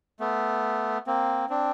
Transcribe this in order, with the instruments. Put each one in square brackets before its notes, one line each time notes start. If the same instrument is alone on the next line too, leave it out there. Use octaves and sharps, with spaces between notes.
[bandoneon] A3 B3
A#3 C4
C4 D4